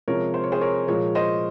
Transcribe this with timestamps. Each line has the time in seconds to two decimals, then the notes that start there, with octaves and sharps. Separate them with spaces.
0.08 C3 F3 G#3 A#4 C#5
0.34 C5
0.44 C#5
0.52 G#4 C5
0.61 A#4 C#5
0.88 A#2 F3 G#3 A#4 C#5
1.15 C5 D#5